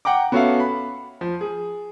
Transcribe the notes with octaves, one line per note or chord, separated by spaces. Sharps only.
F#5 G5 A#5 D6
B3 C#4 F#4 A4 E5 F5
B5
F3
G#4